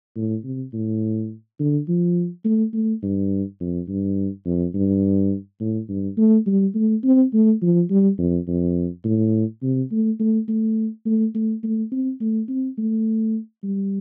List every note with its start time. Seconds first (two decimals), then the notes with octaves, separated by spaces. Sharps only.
0.16 A2
0.44 C3
0.73 A2
1.60 D3
1.88 F3
2.45 A3
2.73 A3
3.03 G2
3.60 F2
3.88 G2
4.46 F2
4.74 G2
5.60 A2
5.89 G2
6.18 A3
6.47 G3
6.75 A3
7.04 C4
7.33 A3
7.62 F3
7.90 G3
8.18 F2
8.48 F2
9.04 A2
9.63 C3
9.91 A3
10.20 A3
10.48 A3
11.06 A3
11.34 A3
11.64 A3
11.92 C4
12.21 A3
12.48 C4
12.78 A3
13.64 G3